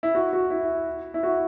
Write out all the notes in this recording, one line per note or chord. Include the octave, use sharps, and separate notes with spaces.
E4
F#4
F#4
E4
E4
F#4